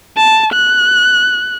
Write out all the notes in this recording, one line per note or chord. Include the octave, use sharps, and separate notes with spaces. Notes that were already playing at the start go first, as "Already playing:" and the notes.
A5
F#6